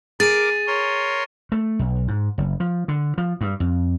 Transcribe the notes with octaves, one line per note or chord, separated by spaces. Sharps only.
G#4 A#4 D6 A6 D#7
A#4 C#5 C6
A3
B1
G#2
F#1
F3
D3
F3
G2
F2